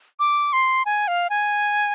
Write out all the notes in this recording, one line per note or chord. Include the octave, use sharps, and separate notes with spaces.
D6
C6
G#5
F5
G#5